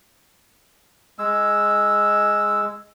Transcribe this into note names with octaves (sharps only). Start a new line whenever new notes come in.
G#3 E6